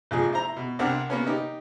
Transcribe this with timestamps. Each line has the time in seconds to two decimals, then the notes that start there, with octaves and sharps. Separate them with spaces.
0.11 A1 F3 G#4
0.33 E4 C5 A#5
0.56 B2
0.79 C2 C4 D4 A#4 F#5
1.10 A#3 B3 C#4
1.26 D#4 G4